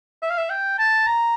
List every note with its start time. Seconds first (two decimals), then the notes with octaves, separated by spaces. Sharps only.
0.22 E5
0.30 F5
0.38 E5
0.50 G5
0.78 A5
1.07 A#5